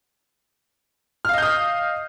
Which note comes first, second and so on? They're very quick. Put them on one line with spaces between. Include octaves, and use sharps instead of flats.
F6 F5 D#5 G6 D#6